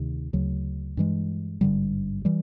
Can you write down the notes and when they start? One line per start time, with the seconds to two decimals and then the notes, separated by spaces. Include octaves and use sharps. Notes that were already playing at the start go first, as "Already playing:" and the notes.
Already playing: D2 C3 D#3
0.33 D2 C#3 F#3
0.97 G2 E3 G#3
1.61 G#1 G2 D3 G3
2.25 E3 G3